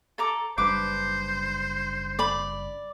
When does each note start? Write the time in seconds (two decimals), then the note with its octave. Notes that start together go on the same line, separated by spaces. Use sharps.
0.18 A4 A#5 D6
0.58 F#1 G3 D4 B4 C5 D6
2.19 D5 B5